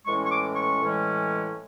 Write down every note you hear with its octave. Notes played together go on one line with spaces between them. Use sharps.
A2 E3 G#3 C#4 C#6
C#6
D6
C#6
A2 E3 G#3 C#4